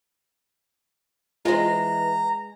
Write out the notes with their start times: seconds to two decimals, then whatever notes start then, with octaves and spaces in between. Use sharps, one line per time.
1.45 E3 G#3 F4 C5 A#5